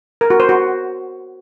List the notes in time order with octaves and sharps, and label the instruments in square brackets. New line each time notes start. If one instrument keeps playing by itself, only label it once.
[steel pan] A#4
F#4
C5
F#4